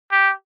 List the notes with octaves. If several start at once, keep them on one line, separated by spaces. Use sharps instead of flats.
G4